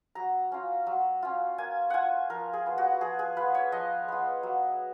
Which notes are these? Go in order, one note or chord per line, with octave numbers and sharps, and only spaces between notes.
F#3 A#5
C#4 F4
F#3
C#4 F4
A#3 G#5
F4 F#5 G#5
F3 A#4
G#4
B3 F4
F#4
F3 G#4
G#4
B3 F4 B4
C#5
F3 D#5
B3 F4
F#3